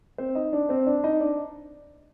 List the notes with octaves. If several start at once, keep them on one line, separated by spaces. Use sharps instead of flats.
C4 C5
D#4 D#5
D4 D5
C4 C5
D4 D5
D#4 D#5
D4 D5